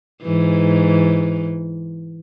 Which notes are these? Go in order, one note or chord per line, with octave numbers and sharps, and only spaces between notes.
G#2 E3